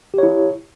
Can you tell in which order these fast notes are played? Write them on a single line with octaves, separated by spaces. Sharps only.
G4 C#5 E4